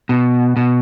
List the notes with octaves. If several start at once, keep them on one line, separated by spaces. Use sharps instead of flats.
B2
B2